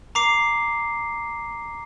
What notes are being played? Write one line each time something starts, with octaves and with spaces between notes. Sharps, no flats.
A#5 D6 C7